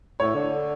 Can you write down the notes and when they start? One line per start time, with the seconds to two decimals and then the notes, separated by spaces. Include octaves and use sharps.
0.20 A2 C#5
0.34 D3